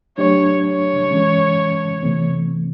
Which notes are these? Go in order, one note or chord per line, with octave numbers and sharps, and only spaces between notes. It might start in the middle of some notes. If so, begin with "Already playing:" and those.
F#3 A3 D4 G4 C#5
C#5
E3 G#3 C#4
C3 E3 A3 C4